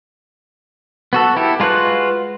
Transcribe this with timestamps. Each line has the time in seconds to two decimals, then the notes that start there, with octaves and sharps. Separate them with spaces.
1.13 B3 F#4 A4
1.36 E4 G4 A4
1.60 G#3 F4 F#4 B4 F#6